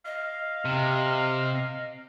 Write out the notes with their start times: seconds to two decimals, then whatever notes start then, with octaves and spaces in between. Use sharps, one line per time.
0.06 D#5 F5
0.65 C3